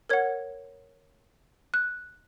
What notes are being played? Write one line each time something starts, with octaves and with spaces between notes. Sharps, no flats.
A#4 C#5 F#5 G#6
F#6